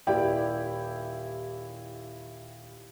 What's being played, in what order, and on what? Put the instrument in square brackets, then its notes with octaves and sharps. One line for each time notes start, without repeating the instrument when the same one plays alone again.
[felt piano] D#1 E4 G4 D5 G5